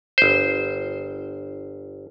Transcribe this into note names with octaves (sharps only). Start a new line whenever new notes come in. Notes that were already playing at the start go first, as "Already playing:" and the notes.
G1 C5